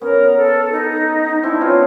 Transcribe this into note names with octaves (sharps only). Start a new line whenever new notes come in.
B3 C#4 A#4
A4
D#4
C4 D4 E4
B3 C#4 F4